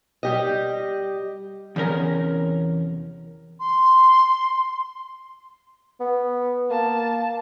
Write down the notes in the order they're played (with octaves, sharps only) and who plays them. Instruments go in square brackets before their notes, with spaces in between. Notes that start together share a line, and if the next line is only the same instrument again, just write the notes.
[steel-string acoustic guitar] G3 G4 D#5
[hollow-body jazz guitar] E2 C3 C#4 A#4 A#5
[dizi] C6
[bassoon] B3
[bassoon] A#3 [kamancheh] A5